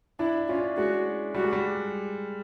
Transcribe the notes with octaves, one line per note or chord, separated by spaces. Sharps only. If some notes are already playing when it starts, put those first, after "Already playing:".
D4 E4
E4
C#4 F4
D4
G#3 F#4
G3 F#4
G#3
G3